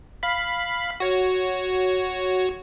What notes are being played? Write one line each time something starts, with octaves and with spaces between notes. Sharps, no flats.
F5 B5
F#4 C#5